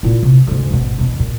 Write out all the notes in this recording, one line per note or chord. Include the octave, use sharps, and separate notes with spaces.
A#2 E4
C3
D2 G#2
G#1 B2
E2 B2
A#2